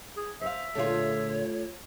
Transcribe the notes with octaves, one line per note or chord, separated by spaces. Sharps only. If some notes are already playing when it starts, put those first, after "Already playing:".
G#4
C5 C#5 E5 F5
A#2 D3 A3 F4 G#4 C#5